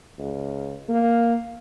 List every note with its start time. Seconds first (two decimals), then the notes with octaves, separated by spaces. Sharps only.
0.19 C#2
0.89 A#3